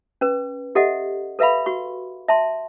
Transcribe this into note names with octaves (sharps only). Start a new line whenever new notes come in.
C#4 B4
G4 A4 D#5 E5 F#5
A4 B4 E5 F5 B5
F#4 C#6
E5 A5 C6